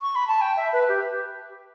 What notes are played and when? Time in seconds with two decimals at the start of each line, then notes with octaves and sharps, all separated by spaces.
0.02 C#6
0.15 B5
0.28 A5
0.41 G5
0.57 E5
0.73 B4
0.89 G4